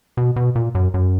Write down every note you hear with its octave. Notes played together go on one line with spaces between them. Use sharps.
B2
B2
A#2
F#2
F#2